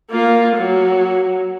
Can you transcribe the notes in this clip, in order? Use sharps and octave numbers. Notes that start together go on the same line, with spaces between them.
A#3 F4
F#3